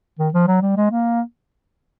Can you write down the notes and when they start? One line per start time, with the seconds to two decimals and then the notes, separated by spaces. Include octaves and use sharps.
0.19 D#3
0.34 F3
0.48 F#3
0.62 G3
0.77 G#3
0.91 A#3